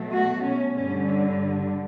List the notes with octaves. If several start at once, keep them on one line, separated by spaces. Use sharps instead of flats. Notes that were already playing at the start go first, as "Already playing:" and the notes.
Already playing: B2 F#3 A3
F#4
C#4
G2 D3 G3 C#4